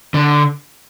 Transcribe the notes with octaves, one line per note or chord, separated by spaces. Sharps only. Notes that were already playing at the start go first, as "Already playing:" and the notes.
D3